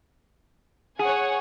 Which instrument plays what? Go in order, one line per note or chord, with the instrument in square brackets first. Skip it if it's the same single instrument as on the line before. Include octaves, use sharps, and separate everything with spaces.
[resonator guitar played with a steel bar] G#4 [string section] C#5 F#5 G#5